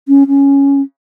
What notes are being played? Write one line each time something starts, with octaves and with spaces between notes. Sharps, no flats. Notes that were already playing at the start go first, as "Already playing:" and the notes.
C#4
C#4